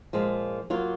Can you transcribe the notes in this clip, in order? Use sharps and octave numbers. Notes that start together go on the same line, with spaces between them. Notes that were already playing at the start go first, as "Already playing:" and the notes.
A#2 F3 G#3
F#3 A#3 F4